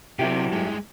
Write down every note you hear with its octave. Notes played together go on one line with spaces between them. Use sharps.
C3 F#3 E4 G4
G2 G#3